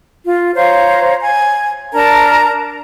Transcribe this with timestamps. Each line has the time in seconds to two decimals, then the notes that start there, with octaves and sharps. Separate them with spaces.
0.25 F4
0.56 C5 C#5 F5 A#5
1.20 G#5
1.93 D4 A#4 A5 A#5